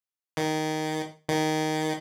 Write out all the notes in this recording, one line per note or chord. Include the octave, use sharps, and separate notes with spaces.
D#3
D#3